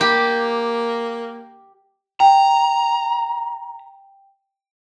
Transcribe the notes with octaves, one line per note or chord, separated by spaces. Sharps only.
A#3 G4
G5 A#5